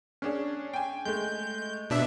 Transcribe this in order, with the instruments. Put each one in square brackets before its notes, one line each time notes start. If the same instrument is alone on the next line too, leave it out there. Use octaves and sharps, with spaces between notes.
[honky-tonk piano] C#4 D4 G#4
G5 G#5
[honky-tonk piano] G#3 A3 [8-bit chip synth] G6
[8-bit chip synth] B2 D4 E5